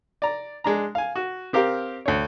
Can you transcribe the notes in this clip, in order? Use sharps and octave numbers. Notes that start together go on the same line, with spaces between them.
D5 A#5
G#3 D4 A#5
F5 G#5
F#4
C4 G4 A#4 F5
D2 C#5